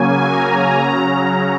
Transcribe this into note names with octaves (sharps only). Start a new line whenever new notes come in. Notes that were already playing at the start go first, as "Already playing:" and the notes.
Already playing: C#3 F#3 A#3 C#4 G#5
A#5
C#3 F#3 C#4